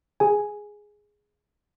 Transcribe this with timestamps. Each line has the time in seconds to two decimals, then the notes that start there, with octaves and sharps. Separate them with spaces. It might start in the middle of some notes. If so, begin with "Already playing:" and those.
0.20 G#4 G#5